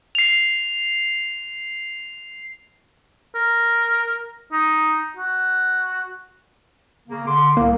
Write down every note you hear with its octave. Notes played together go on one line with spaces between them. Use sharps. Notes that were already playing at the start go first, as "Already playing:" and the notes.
C7 F7
A#4
D#4
F#4
C#3 A#3
D3 C6 D6
C2 A2 A#3